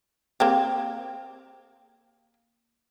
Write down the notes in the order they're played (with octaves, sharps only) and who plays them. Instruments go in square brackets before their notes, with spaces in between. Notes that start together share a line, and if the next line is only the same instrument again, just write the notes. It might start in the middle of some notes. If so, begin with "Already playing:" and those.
[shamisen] A#3 C4 G4